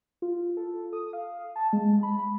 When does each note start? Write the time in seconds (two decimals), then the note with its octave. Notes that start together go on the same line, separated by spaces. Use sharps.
0.22 F4
0.57 A4
0.93 D#6
1.13 F5
1.56 A5
1.73 G#3
2.03 B5